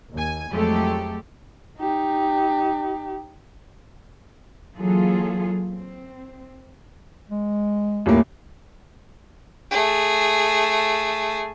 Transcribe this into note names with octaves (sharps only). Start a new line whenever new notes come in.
D#2 G#5
F2 F#3 G#3 A3 G4 A4
D#4 G4
E3 F#3 A#3 F4 G#4 A4
C4
G#3
D#1 A2 A#3
A3 G#4